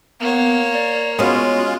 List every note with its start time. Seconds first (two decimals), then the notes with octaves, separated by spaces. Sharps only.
0.20 A#3 B3 C#5
0.73 D5
1.19 G#3 B3 C#4 F4 F#4